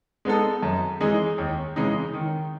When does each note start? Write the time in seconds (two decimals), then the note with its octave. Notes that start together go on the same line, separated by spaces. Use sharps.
0.25 G#3 B3 D#4 A4
0.63 F#2
1.01 E3 G#3 D#4 G#4
1.38 D#2
1.76 C#3 E3 G#3 D#4
2.14 D#3